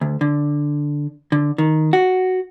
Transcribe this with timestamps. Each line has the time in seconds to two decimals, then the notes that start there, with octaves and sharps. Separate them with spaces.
0.01 D2
0.21 D3
1.32 D3
1.58 D#3
1.93 F#4